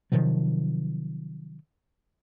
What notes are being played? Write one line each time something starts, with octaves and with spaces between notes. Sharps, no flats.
C3 D#3 F3 F#3